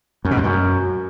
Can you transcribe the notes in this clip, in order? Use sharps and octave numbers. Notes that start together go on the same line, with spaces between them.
F#2
B2
F2
F#2